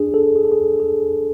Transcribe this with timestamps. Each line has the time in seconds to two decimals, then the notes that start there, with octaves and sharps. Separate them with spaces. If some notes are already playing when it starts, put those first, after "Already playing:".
Already playing: D4 G#4
0.14 A4
0.36 G#4
0.45 A4
0.52 G#4
0.80 G#4